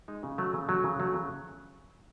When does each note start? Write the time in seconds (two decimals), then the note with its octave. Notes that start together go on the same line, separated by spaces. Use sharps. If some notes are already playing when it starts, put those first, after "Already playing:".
0.08 G#3 D#4
0.23 C#3
0.38 F#3 A3
0.54 C#3
0.69 F#3 A3
0.84 C#3
1.00 F#3 A3
1.14 C#3